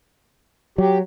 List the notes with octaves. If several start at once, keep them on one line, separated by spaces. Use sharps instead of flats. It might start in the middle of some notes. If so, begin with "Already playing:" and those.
F#3 G4